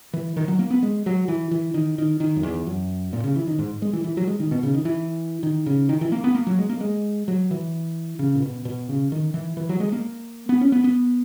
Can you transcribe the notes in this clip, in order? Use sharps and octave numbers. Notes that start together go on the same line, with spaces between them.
E3
D#3
F#3
A#3
B3
G#3
F#3
E3
E3
D#3
D#3
D#3
F#2
E2
F#2
A#2
C#3
E3
D#3
G#2
G#3
E3
E3
F#3
G#3
D#3
B2
C#3
D#3
E3
D#3
C#3
D#3
E3
A#3
B3
A#3
F#3
G#3
A#3
G#3
F#3
E3
C#3
A#2
B2
B2
C#3
D#3
E3
E3
F#3
G#3
A#3
B3
C#4
B3
B3